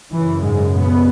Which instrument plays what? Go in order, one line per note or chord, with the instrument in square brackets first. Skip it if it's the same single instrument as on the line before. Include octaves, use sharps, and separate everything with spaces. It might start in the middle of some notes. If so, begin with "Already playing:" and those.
[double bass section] F#2 C#3 E3
G#2 G#3
B2 B3